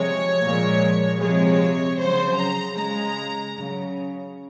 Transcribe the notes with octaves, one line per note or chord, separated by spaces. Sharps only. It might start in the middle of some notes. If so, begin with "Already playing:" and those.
Already playing: C3 F3 G#3 C#5
A#2 F3 G#3
C3 F3 G#3 C#5
C#3 F#3 C5
A#5
C#3 G#3 A#5
C#3 F#3